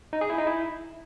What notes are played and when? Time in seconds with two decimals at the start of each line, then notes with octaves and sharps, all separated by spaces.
0.13 D#4
0.21 G#4
0.30 E4
0.38 D#4
0.47 E4